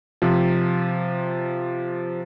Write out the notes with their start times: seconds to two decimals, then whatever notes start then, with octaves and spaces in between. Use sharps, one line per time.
0.22 C3 F3